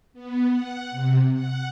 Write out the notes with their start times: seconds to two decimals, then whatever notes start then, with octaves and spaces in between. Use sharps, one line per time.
0.13 B3
0.49 F#5
0.91 C3
1.33 F#5